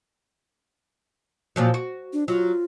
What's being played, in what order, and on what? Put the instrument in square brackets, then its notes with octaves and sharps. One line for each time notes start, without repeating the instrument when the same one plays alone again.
[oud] A#2 F3 F#3
F#4
[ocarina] D4
[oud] F#3 [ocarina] F4